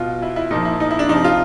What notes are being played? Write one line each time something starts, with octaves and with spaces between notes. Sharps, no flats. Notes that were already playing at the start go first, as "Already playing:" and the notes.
Already playing: B2 F4
E4
E4
A#2 F3 D#4
E4
D#4
E4
D4
C3 F3 D#4
F4